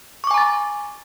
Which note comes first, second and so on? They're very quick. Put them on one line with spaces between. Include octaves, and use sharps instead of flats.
C#6 D6 G#5 A#5 A6